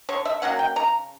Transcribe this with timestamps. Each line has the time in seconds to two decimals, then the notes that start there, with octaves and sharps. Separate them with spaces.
0.09 D3 C#5
0.25 E5
0.42 F#3 A#3 C#4 F#5
0.59 G5
0.76 C#3 A#5